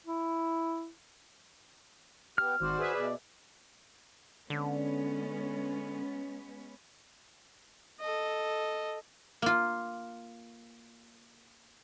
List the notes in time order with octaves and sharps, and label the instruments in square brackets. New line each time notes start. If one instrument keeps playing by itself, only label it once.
[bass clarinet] E4
[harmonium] B3 G4 [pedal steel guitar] F6
[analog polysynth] G#1 [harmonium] F#4 C5 D5
[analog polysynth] G#4 B4 E5
[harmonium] B2 D5
[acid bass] D3 [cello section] G#3 B3 C#4
[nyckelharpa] A4 D#5
[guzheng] A#3 F4